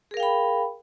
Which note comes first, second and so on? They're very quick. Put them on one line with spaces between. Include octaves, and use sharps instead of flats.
G#4 A#4 F5 G5 B5